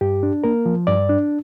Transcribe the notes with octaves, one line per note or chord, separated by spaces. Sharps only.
G2 G4
D4
A#3 A#4
F3
G2 D5
D4